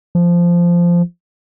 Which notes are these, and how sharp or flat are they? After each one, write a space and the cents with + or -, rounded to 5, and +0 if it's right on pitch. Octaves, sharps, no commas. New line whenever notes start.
F3 -10